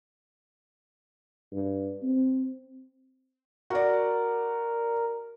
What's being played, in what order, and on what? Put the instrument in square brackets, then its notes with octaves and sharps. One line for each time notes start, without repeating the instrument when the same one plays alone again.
[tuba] G2
C4
[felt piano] F#4 D5 [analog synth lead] A#4